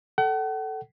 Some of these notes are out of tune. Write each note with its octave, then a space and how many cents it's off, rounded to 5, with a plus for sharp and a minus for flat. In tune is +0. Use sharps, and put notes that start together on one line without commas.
A4 +0 F#5 +40